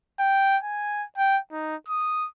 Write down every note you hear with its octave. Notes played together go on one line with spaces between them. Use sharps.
G5
G#5
G5
D#4
D#6